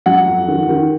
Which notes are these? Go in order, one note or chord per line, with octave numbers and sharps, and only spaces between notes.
F#3 F#5
F2
D#3
D#3